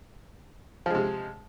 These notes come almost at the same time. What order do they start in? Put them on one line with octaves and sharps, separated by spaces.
F3 G#3 C3